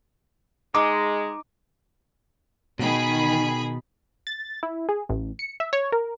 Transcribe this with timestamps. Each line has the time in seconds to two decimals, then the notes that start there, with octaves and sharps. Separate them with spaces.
0.75 G#3 D#4 D6
2.79 B2 D#3 G#4 B5
4.27 A6
4.63 E4
4.89 G#4
5.09 A1
5.39 C#7
5.60 E5
5.73 C#5
5.92 A#4